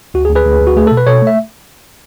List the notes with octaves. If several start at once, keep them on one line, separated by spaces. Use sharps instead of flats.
D2 F#4
G#4
D2
G#4 B4
D2
D2
F#4
A3 G#4
B2 A4
B4
B2 A4 C#5
A3
E5